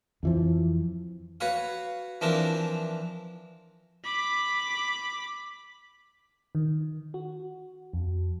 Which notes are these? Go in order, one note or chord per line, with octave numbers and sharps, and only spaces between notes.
F2 E3 F3
F#4 B4 C#5 F5
E3 F3 C4 D4 A#4
B5 D6
D#3
F#4
F2